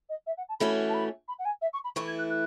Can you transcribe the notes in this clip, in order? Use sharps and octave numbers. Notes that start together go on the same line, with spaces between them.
D#5
E5
F#5
A5
E3 A3 C#4 F#4 B5
A5
B5
B5
F#5
G#5
E5
C#6
B5
E3 A3 E4 C#6
G#6
F#6
F#6